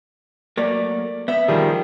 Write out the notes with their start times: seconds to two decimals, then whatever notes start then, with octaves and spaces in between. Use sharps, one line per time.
0.57 F#3 A3 A#3 D5
1.28 B3 E5
1.48 D#3 F3 G3 G#4